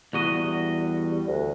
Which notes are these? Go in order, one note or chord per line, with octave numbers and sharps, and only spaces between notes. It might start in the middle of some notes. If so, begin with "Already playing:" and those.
E2 G3 F#4 D#5
D2